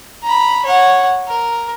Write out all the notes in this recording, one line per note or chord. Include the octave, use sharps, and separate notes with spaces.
A#5 B5
C#5 F#5
A#4